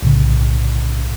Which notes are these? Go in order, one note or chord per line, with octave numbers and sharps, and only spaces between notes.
B1 A2 C#3